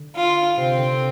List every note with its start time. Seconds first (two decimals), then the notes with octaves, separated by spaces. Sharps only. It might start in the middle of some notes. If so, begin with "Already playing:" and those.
Already playing: D3
0.16 F4
0.57 C3 C4
0.78 D3